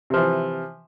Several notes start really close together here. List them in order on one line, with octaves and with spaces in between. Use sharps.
C3 F3 E3